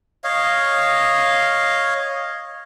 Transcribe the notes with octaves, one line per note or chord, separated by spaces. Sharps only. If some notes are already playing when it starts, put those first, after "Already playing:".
C#5 D#5 F5